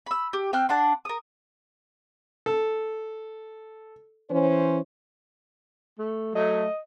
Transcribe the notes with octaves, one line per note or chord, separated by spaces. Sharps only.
B5 E6
G4
C4 G5 F6 F#6
D4 F#5 C6
A#4 D#6
A4
E3 C#4 C5
A3
F#3 A3 D#5